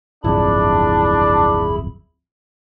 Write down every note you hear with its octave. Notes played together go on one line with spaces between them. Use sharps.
D1 G1 F2 D4 E4 G#4 B5